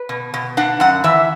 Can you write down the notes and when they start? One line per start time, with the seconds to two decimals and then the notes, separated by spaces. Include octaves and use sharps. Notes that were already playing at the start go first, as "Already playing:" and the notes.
Already playing: B4
0.09 B2
0.34 B2
0.57 D4 F#5
0.80 F#2 F#5
1.04 E3 E5